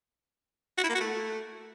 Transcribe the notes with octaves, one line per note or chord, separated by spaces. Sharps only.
F#4
E4
A#3
F#4
A3